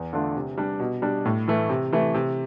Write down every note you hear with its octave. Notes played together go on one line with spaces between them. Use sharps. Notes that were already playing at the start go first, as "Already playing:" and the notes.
Already playing: E2
D3 A3 D4 F4
C3
G3 D4
B2
G3 D4
A2
E3 A3
C3
E3 A3 E4
C3